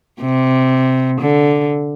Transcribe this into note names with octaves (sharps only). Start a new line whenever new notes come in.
C3
D3